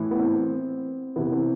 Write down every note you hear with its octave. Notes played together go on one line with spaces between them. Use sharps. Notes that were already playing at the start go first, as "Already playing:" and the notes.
Already playing: A2 E3
B3
C4
C3 E3 B3
B3
C4